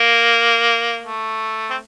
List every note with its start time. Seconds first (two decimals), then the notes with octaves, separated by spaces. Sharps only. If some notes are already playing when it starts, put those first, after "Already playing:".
Already playing: A#3
1.02 A3
1.70 C4